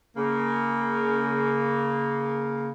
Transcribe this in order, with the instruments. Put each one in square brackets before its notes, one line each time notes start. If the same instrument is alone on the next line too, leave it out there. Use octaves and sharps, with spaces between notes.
[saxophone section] C#3 A#3